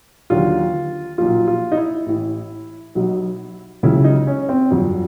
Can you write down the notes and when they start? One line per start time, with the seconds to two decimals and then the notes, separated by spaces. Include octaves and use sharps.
0.30 D#2 D3 F#3 F4
1.18 B1 A#2 F3 F4
1.47 F4
1.72 D#4
1.77 E4
2.06 A1 A2 E3
2.95 B1 B2 F#3
3.83 C#2 C#3 F#3 E4
4.04 D#4
4.27 C#4
4.49 C4
4.71 G1 F2 D3 F#3